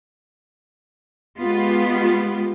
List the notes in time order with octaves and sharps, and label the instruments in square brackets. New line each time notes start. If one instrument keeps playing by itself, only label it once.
[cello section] G#3 B3 F4 G4